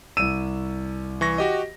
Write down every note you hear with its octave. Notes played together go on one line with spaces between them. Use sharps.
C2 E6 D#7
E3 C#6 A#6
F#4 G4 D#5